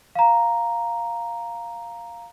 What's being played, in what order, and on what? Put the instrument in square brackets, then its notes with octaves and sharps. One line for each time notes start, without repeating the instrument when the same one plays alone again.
[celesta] F5 A#5